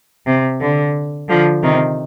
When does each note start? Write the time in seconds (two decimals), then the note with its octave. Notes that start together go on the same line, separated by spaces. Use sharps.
0.26 C3
0.61 D3
1.28 D3 F3
1.63 C3 D#3